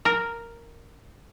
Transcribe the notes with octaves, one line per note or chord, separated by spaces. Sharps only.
A#4